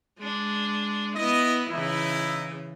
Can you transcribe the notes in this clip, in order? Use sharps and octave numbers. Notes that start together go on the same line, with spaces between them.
G#3 D4
B3 E4 D#5
C#3 E3 D#4 E4